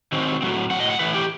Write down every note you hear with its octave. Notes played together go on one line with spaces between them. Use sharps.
D#3 F#3 C4
A2 F#3 C4
A2 F#3 C4 F#5
D#5
F#5
A2 E3 A3 B4
G4